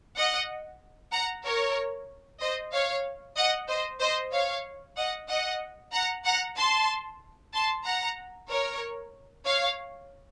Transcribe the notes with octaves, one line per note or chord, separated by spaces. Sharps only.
D#5 F#5
F#5 A#5
A#4 C#5
C5 D#5
C#5 F5
D#5 F#5
C5 D#5
C5 D#5
C#5 F5
D#5 F#5
D#5 F#5
F#5 A#5
F#5 A#5
A5 C6
A5 C6
F#5 A#5
A#4 C#5
C#5 F5